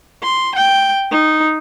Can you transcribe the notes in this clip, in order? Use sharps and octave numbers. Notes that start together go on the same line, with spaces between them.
C6
G5
D#4